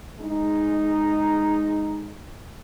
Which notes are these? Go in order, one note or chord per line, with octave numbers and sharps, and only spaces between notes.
G#3 D#4